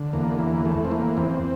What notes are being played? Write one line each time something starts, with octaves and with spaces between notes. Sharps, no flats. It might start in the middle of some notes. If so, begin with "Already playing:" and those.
Already playing: D3
E2 A#3
E3
E3 A3
C4
E3 A#3
E2 C4